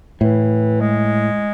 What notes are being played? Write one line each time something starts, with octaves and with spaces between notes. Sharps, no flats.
A2 E3
G#3